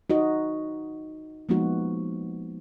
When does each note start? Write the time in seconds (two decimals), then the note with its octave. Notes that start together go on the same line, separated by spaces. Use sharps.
0.10 D#4 F#4 D#5
1.49 F3 G#3 A#3 B3 D#4 F#4